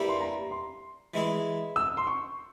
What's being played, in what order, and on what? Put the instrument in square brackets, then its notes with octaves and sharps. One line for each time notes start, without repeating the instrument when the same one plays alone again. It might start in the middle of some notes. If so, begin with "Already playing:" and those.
Already playing: [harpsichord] G2 G3 A#3 E4
[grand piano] C6
A#5
C6
[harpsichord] E3 G#3 E4 G#4
[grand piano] E6
C6
C#6